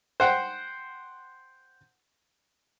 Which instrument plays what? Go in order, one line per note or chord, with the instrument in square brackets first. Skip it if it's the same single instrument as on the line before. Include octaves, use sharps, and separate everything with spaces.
[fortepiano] C5 F#5 G5